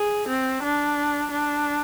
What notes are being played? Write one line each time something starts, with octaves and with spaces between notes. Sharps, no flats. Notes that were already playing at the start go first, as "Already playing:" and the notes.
Already playing: G#4
C4
D4
D4